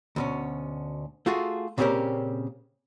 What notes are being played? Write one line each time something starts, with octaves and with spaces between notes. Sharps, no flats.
D2 B2 C#4
A3 F4 F#4 G#4
A#2 C#3 C4 C#4 G4 A#4